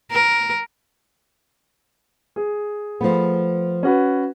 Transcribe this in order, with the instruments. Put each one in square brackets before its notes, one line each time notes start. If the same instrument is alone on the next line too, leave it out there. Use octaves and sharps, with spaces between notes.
[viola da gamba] A#4
[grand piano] G#4
[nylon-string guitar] F3 A3 B3
[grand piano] C#4 F#4 B4